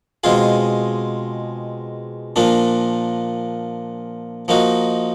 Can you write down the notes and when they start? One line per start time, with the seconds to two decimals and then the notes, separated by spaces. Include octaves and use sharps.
0.24 B2 G#3 C4 F4 G#4
2.36 A#2 F3 A#3 D4
4.48 F3 A#3 D#4 F#4